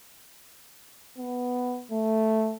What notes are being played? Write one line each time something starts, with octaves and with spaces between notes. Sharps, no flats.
B3
A3